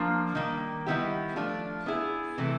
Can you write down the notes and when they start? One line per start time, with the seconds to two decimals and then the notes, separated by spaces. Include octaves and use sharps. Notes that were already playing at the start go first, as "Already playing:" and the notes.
Already playing: F3 A#3 D4 F4
0.35 D#3 G3 A#3
0.86 D#3 G3 B3 E4 G4
1.36 F3 A3 D4 F4
1.86 B3 E4 G#4
2.38 C3 E3 A3